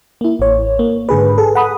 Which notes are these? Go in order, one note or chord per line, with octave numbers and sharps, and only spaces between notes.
A#3 E4
A1 C#5
A#3
G#2 D3 G#4 B4
G#4 A4
F#5 B5 D#6